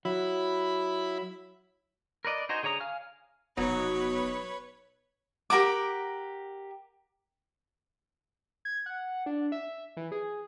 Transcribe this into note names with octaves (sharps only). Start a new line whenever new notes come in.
F#3 E4 B5
A#4 B4 D5 D#5
D#4 F#4 C5 D#5 G#5
D3 G#4 C#5 A#5 D#6
F5 G#5 F6
F1 B2 F#3 D#4 B4 C#5
G4 A#4 F#5 D6
G#6
F#5
D4
E5
E3
G#4